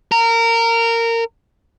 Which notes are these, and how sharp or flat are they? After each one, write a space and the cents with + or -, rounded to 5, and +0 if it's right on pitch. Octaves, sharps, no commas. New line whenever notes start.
A#4 -20